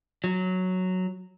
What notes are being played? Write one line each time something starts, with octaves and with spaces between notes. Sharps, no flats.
F#3